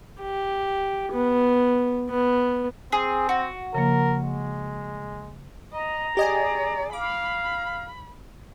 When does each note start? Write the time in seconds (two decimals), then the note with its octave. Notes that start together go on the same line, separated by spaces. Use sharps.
0.21 G4
1.12 B3
2.10 B3
2.92 C4 G#4
3.29 F#4
3.74 C#3 F3 A#3 A#4
4.24 G#3
5.73 D#5 A#5
6.17 G4 G#4 D5 D#5 G#5
6.93 F5 B5 D6